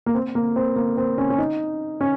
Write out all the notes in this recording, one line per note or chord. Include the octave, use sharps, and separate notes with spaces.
A#3
C4
A#3
C4
A#3
C4
C#4
C#4
D#4
C#4